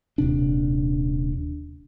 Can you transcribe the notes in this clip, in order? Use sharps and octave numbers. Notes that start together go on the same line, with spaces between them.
D#1 C3 D4